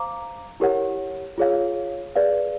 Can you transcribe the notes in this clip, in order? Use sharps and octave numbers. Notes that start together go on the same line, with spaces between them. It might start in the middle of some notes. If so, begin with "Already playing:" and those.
Already playing: C5 F5 A#5 D6
E4 G4 A#4 C#5 F#5
F4 G#4 C#5 F5
G#4 B4 D5 F5